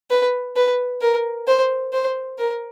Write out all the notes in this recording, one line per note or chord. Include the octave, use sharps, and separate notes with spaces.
B4
B4
A#4
C5
C5
A#4